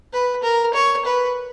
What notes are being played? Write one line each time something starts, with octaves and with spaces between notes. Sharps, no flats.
B4
A#4
C#5
B4